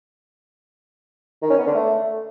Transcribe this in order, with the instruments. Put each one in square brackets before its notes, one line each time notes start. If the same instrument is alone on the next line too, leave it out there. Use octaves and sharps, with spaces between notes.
[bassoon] D#3
C#4
B3
D3
A3